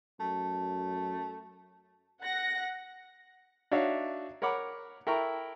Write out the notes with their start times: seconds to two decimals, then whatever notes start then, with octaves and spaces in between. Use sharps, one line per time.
0.20 F#2 A3
2.22 F#5 A#6
3.72 D4 D#4 F#4 C#5 E5 F5
4.42 A#4 C#5 F#5 B5 D6
5.07 E4 A4 A#4 G5 A#5 C#6